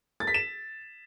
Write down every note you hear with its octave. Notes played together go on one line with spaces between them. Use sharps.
A6
B6
E7